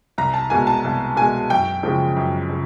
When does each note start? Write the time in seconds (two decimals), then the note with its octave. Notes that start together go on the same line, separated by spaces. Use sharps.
0.18 C2 A#5
0.34 A5
0.50 B2 G#3 G#5
0.67 A5
0.84 C2
1.17 B2 G#3 G#5
1.50 F#2 G5
1.83 C#3 F3 G#3
2.17 F#2
2.49 C#3